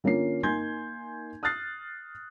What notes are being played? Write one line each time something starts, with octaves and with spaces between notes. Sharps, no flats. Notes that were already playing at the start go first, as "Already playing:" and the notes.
D3 A#3 C#4 F4 C7
A#3 D#4 G#5 C6 G6 G#6
D#6 F6 F#6 A6 C7